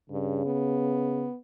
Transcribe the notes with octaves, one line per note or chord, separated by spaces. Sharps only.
G2 C#3
B3